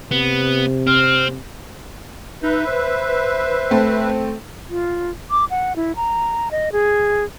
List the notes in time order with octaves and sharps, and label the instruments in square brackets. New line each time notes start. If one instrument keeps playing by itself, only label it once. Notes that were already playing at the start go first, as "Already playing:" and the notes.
[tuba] C3 [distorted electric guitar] B3
[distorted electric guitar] C4 [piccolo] F6
[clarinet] D#4 [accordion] B4 E5
[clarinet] C5
[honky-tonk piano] A3 C4
[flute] F4
D6
F#5
E4
A#5
D#5
G#4